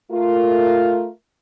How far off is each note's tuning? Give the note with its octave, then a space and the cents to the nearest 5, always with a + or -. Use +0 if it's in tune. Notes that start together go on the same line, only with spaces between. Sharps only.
A3 +0 F4 +0 A#4 +0